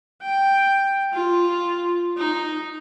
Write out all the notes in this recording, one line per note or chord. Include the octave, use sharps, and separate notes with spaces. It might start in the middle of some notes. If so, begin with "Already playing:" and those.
G5
F4
D#4